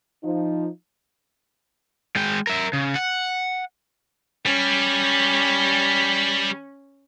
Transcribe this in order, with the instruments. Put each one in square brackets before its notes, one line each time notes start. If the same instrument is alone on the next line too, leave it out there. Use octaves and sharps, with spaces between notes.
[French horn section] F3 D#4
[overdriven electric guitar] G#3 G5
A#4 E5
C#3
F#5
[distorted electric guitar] G3 [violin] C#4